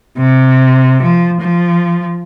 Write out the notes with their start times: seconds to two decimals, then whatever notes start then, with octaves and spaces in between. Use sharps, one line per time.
0.18 C3
1.03 F3
1.41 F3